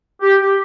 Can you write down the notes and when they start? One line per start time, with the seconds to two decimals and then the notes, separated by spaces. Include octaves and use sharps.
0.22 G4
0.41 G4